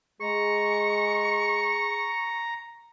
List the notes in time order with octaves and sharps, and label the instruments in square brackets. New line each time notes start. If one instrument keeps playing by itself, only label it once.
[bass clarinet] G#3 [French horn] G#4 [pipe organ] A#5 [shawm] C#6